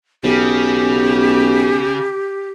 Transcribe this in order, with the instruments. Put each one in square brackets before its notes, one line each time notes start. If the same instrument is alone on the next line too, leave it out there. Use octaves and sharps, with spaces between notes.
[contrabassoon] B1 [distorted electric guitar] C#3 [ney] G4